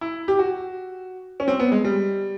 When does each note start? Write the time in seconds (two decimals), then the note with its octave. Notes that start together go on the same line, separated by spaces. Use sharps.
0.01 E4
0.28 G4
0.39 F#4
1.40 C#4
1.48 C4
1.60 B3
1.72 G#3
1.85 G3